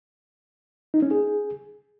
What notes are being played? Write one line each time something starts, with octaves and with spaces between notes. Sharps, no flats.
D#4
C#4
G#4